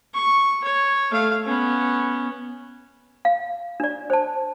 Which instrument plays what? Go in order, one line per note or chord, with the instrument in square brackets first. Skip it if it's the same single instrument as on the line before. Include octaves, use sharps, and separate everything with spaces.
[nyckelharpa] C#6
C#5
A3 F5
B3 C#4
[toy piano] F5
D4 D5
C5 A5